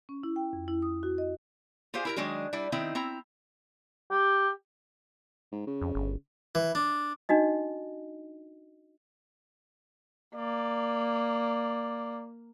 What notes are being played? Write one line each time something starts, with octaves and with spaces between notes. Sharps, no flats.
C#4
E4
G5
F2
E4
D#6
F#4
D#5
F4 G4 G#4 C5 F5
E4 A#4 A#5
D#3 F#3 G#3 D4 G#4
G3 D4 E4
D#3 C4 D#4 E4
C4 E4 A#5
G4
G#2
C#3
F2
G1
E3
D4
D4 D#4 F#4 D#5
A#3 D5